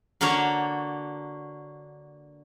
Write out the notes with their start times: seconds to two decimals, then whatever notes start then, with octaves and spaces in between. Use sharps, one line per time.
0.21 D3 A#3 D4 F#4 C#5